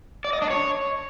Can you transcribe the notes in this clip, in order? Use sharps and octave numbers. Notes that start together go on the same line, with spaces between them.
D5
D#5
D4
C#5